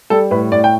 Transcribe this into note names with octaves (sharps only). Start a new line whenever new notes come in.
G3 A4
A2 B4
A2 D5
G5